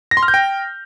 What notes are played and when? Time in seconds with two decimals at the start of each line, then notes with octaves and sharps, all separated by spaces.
0.11 A#6
0.17 C6
0.23 F6
0.28 G6
0.34 G5